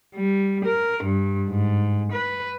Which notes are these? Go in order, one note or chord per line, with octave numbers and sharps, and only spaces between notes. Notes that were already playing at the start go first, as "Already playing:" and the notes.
G3
A#4
G2
G#2
B4